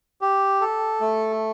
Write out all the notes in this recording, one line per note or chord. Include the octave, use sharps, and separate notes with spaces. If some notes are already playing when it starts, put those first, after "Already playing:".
G4
A4
A3